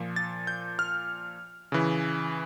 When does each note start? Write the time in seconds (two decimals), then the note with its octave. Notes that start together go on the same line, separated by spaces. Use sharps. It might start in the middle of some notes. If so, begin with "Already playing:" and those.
Already playing: A#2 F3
0.16 A6
0.47 G6
0.79 F6
1.72 C#3 E3